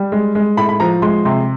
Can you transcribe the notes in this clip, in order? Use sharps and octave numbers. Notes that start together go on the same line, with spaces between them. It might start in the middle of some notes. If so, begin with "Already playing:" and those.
Already playing: G3
G#3
G#3
A2 B5
B5
F3 A#5
G#3 C6
C3 C6